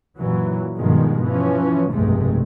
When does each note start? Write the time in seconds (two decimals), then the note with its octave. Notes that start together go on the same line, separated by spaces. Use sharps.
0.18 F#2 A#2 E3 F#3
0.76 G2 B2 D#3 F3 G#3
1.24 E3 F3 C#4
1.91 F1 B1 G2 C3 G#3 A3